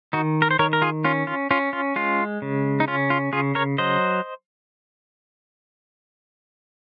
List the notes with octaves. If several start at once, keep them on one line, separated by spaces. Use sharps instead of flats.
D#3 D#4 F#4
A#4
C5
D#3 A#4 C#5
A#4
F4 G#4
C#4 F4
F4
C#4 F4
F4
G#3 F4
C#3
D#4
C#4 F4
F4
C#3 F4 G#4
A#4 C#5
F#3 C5 D#5